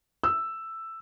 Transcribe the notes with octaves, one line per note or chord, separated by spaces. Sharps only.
E6